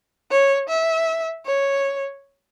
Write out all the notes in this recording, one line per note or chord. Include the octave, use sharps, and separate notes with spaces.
C#5
E5
C#5